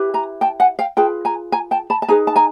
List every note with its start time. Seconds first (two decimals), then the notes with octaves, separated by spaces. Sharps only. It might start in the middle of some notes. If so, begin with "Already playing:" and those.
Already playing: E4 G4 B4
0.14 G#5 A#5
0.41 G5 A5
0.60 F#5 G#5
0.79 F5 G5
0.97 F4 G#4 B4 G5 A5
1.25 G#5 A#5
1.52 G#5 A#5
1.71 G5 A5
1.90 A5 B5
2.02 A5
2.08 D#4 G#4 B4 G#5 A#5
2.27 A5
2.36 G#5 A#5